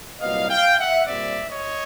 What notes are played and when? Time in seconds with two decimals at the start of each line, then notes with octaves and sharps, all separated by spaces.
0.21 C2 A#2 F#3 B3 D#5 F5
0.49 F5 G5
0.79 E5 F#5
1.07 A#2 G3 C4 D5 E5
1.50 C#5 D#5